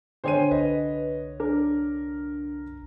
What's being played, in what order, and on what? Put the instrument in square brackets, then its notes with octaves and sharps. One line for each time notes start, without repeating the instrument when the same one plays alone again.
[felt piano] D3 C#5 D#7 [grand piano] C5 G5 G#5
[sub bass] C2 [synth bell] B4 [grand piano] D#5
[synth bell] D4 [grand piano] A#4